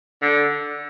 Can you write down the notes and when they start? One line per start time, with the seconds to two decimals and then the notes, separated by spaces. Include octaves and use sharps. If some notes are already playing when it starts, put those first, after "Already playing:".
0.22 D3